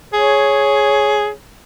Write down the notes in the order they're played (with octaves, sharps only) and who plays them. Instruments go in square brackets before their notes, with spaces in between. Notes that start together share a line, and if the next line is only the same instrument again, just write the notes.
[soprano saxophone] G#4 [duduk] C#5